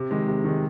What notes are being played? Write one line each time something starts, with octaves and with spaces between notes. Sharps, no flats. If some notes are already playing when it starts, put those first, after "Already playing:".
Already playing: C3
D#3 G#3
C3
D#3 G#3